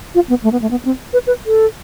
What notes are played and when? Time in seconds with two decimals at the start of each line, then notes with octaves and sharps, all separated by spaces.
0.15 F4
0.29 B3
0.44 A3
0.52 B3
0.62 A3
0.71 B3
0.85 C4
1.13 B4
1.27 B4
1.46 A4